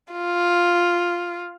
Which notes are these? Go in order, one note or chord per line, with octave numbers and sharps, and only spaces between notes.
F4